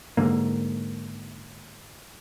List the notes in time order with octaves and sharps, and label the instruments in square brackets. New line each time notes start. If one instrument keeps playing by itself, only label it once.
[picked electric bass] G#2 D3 A#3